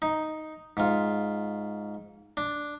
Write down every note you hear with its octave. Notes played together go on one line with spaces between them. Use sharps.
D#4
G#2 F4
D4